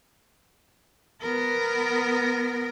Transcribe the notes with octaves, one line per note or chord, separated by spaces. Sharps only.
B3 A#4